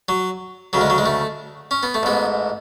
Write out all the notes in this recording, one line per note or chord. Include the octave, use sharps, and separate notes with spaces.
F#3
D2 C#3 F#3
G#3
F#3
G#3
A3
C#4
B3
A3
A1 G#2 B3